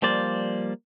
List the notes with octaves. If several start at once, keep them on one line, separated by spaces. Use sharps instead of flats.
F3 G3 A#3 C5 D5